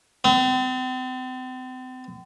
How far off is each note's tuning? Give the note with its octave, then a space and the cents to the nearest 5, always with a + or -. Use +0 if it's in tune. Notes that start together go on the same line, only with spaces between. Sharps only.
C4 -40